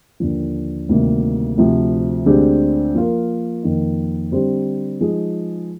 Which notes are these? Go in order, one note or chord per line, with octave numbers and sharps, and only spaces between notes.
D#2 D3 F3
D2 C3 D#3 G3 A#3
D2 C3 F3
D2 D3 G#3 C4 G4
F3 A#3 F4 A#4
F2 D#3 A#3 D#4
D3 G3 C4 G4 C5
F3 G#3 D#4